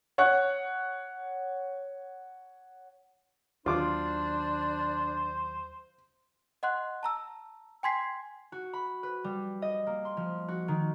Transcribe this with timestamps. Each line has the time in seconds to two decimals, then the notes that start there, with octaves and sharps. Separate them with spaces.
0.18 C#5 F#5 F#6
3.66 D#2 D#3 F#3 D4 F4 C5 D6
6.63 D#5 F#5 C6 F#6
7.03 A5 A#5 E6
7.83 G5 G#5 C6 G#6 B6 C7
8.52 F#4
8.73 B5
9.03 B4
9.24 G3
9.62 D#5
9.87 A#3
10.05 C6
10.17 F3
10.48 F#4
10.68 D#3